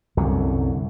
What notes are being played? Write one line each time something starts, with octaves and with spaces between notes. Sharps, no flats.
C2 F#2 D3